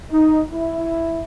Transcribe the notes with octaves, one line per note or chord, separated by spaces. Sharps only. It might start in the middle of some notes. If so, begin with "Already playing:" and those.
D#4
E4